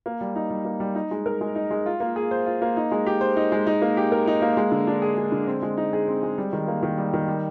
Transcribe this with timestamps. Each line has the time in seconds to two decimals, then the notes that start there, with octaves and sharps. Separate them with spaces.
0.06 A#3
0.21 G3
0.36 D#4
0.50 G3
0.65 A#3
0.80 G3
0.95 D#4
1.11 G#3
1.26 A#4
1.41 G#3
1.55 D#4
1.71 G#3
1.86 F4
2.00 A#3
2.16 G#4
2.31 C5
2.46 F4
2.62 A#3
2.77 D#4
2.91 G#3
3.07 G4
3.21 C5
3.37 D#4
3.52 G#3
3.67 D#4
3.82 A#3
3.97 G4
4.12 A#4
4.27 D#4
4.42 A#3
4.57 G#3
4.72 D3
4.87 D4
5.02 G#4
5.17 G#3
5.32 D3
5.47 C4
5.62 G#3
5.77 D#4
5.93 G#4
6.08 C4
6.23 G#3
6.38 G3
6.53 D#3
6.68 A#3
6.83 D#3
6.98 G3
7.14 D#3
7.28 G3